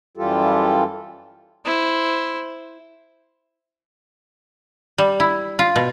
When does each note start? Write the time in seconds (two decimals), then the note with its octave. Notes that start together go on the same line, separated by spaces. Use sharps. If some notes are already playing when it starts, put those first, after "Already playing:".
0.17 F#2 E3 G3 F4 G4 A4
1.65 E4 C5
4.98 G3
5.20 E4
5.59 F4
5.76 B2